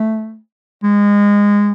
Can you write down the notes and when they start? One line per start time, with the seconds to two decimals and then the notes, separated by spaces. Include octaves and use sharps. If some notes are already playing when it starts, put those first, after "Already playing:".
Already playing: A3
0.83 G#3